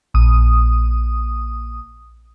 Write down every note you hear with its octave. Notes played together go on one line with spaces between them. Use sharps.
A#1 D#6